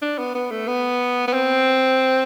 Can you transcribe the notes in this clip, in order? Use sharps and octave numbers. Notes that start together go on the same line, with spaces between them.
D4
B3
B3
A3
B3
B3
C4